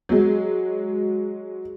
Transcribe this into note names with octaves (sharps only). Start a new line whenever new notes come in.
F#3 G#3